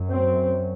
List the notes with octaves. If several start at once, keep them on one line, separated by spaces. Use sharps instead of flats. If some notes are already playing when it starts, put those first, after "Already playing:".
Already playing: F#2
C4